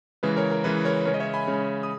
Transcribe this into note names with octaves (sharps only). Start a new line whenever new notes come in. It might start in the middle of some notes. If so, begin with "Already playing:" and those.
C#3 E3 G#3 B4
A#4 C#5
A#4
C#3 E3 G#3 B4
A#4 C#5
C#3 G#3 C#4 A#4 C#5
D#5
C#5 E5
G#5 B5
C#3 G#3 C#4
D#6